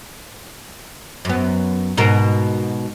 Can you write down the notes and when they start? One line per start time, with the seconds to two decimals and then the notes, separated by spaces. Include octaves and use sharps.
1.25 F#2 B3
1.97 G#2 B2 A#4